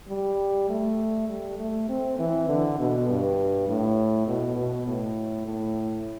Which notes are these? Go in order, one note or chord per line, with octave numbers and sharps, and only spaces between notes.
G3
A3
G3
A3
C4
E3
D3
B2
G2
A2
B2
B2
A2
A2